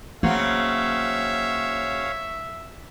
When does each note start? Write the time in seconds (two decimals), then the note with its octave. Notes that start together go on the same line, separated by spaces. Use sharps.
0.23 C#3 F#3 A#3 C4 C#5 E5 F5